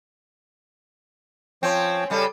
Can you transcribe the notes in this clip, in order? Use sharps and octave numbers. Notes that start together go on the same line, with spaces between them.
F3 C4 C#4 C#5 G5
C#3 G3 A4